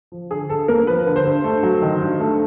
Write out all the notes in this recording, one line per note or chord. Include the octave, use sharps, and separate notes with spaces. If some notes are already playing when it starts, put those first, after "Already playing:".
F3
D3 G#4
G2 A4
A#3 A#4
F3 B4
D3
C5
G2
A3
F#3
D#3
G2
A3